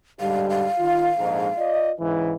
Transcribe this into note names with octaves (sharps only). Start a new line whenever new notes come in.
G#2 D3 G3 F5
F5
D#3 F4
A#1 F2 G#2
F4 D5 D#5
G#2 C#3 E3